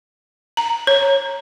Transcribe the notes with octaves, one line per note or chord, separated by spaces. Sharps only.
A#5
C#5